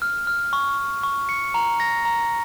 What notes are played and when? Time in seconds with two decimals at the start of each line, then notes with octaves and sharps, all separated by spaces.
0.02 F6
0.27 F6
0.53 C#6
0.78 C#6
1.03 C#6
1.29 C#7
1.54 A#5
1.80 A#6
2.05 A#5